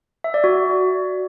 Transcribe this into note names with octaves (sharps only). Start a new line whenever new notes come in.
E5
D5
F#4